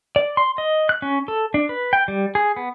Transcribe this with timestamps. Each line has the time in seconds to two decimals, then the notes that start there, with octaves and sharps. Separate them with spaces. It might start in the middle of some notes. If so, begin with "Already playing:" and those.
0.16 D5
0.37 C6
0.58 D#5
0.89 F#6
1.02 C#4
1.28 A4
1.54 D4
1.69 B4
1.93 G5
2.08 G3
2.35 G#4
2.56 B3